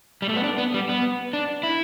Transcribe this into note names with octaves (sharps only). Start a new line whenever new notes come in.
G3
A3
B3
D4
B3
G3
B3
D4
E4